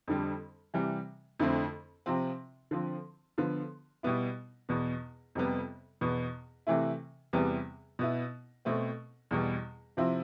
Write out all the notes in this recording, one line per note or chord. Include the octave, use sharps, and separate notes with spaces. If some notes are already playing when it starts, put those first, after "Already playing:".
F2 D3 G3
C3 E3 G3
F2 D3 A3 C4 E4
C3 F3 C4
D3 F3 C4
D3 F3 B3
B2 G3 B3 E4
E2 B2 B3
F2 C3 G3 B3
E2 B2 B3
C3 E3 A3 E4
E2 C3 E3 G3 B3
B2 B3 E4
B2 A3 C4
E2 B2 G3
C3 F3 C4 E4